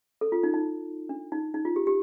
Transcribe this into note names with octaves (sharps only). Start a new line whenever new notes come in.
A4
F4
D#4
D#4
D4
D#4
D#4
F4
G4
G4